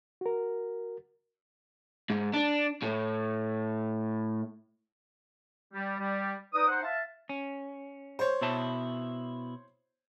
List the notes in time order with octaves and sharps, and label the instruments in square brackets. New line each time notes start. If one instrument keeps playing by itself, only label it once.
[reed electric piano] F#4 A#4
[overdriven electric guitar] G#2
D4
A2
[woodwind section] G3
G3
D#4 B4 D5 D#6
D#4 C5 F#5
E5 F5 A5
[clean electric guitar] C#4
[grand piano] C5 C#5
[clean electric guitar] B2 E4 A5